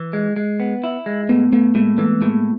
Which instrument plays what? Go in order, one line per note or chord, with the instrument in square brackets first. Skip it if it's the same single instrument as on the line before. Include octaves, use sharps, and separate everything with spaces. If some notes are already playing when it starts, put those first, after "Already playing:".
Already playing: [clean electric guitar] E3
G#3
G#3
B3
E4
G#3
[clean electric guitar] A2 [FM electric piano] A3 B3
[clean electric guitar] A2 [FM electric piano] A3 B3
[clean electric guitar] A2 [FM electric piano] G#3 A#3
[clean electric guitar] E3 [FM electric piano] A3 B3
[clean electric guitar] A2 [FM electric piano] G#3 A#3